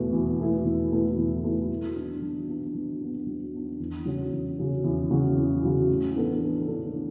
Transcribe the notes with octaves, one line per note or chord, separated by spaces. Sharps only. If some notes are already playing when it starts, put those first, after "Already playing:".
Already playing: E2 B2 A3 E4 B4
E2
B2 A3 E4 B4
E2
B2 A3 E4 B4
E2
B2 A3 E4 B4
F#3
B3 D4
F#3
B3 D4
F#3
B3 D4
F#3
B3 D4
E2
C#3 F#3 C#4 F#4
E2
C#3 F#3 C#4 F#4
E2
C#3 F#3 C#4 F#4
E2
C#3 F#3 C#4 F#4
A2
E3 B3 D4 A4
A2
E3 B3 D4 A4
A2